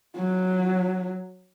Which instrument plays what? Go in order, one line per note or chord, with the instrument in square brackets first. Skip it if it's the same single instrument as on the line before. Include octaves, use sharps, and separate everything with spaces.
[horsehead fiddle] F#3